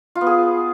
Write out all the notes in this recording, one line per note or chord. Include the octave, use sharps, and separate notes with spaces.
F4
B3
G#4